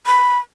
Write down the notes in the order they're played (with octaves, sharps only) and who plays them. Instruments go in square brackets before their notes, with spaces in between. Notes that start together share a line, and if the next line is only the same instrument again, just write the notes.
[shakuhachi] B5